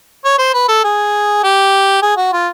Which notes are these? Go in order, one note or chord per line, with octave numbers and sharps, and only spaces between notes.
C#5
C5
B4
A4
G#4
G4
G#4
F#4
F4